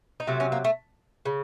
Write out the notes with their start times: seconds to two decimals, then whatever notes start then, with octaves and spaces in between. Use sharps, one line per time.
0.20 D#4
0.27 C3 F#3 A3 F4
0.40 C#4
0.52 A#3
0.64 A3
1.25 C#3